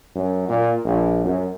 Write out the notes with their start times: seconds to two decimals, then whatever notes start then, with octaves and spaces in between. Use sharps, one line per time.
0.15 F#2
0.48 A#2
0.84 A#1
1.24 F#2